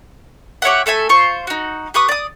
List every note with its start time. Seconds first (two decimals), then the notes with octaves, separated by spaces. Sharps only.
0.62 G4 C#5 E5 F#5
0.86 A3 A4 E5 G#5
1.09 F4 C5 C#6
1.47 D#4 F#4
1.94 G4 B4 C#6 D#6
2.09 D5 D#6